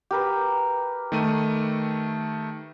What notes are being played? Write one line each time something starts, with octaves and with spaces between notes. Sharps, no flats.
G4 A#4 B4
D#3 A3 D#7